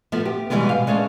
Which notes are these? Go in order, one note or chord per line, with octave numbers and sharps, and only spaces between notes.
F3 A3 B3
G4
B2 D3 E3 G3 G#3 B3
B2 F5
G#3 A3 C#4 G#4 D5